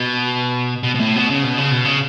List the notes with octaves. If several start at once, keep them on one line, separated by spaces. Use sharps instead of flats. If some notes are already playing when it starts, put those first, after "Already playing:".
Already playing: B2
B2
B2
A2
B2
C#3
B2
C#3
B2
C#3